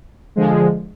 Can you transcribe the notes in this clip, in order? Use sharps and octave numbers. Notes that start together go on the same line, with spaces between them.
D3 F3 G#3